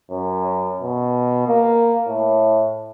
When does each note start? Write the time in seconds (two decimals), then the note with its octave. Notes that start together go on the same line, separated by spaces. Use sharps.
0.11 F#2
0.81 B2
1.48 A#3
2.08 A2